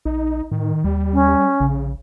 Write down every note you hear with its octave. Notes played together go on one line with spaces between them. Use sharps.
A#1 D#4
A2 D#3
D#2 G3
C#4
A#1 C#3